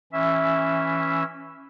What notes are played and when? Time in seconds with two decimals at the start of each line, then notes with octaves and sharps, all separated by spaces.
0.13 E3 C#4 E5